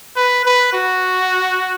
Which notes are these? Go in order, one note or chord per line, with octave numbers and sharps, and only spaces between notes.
B4
B4
F#4